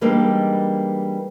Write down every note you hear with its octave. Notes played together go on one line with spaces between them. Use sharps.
E3 G3 G#3 A#3 D4 D#4